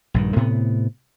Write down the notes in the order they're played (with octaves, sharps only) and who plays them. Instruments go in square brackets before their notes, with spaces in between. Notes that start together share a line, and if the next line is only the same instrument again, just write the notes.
[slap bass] A#1 G2 D#3
A2 C3 B3